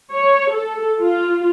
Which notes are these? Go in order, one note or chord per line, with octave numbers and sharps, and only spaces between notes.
C#5
A4
F4